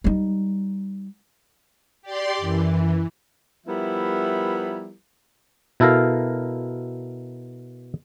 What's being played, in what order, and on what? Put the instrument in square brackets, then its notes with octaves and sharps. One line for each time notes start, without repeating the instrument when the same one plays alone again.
[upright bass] G3 D#4
[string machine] G4 D5 C6
[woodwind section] F#2 [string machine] E3
[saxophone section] F3 G3 B3 E4 A#4 E5
[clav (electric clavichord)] B2 E4 A4 A#4 F5 A#5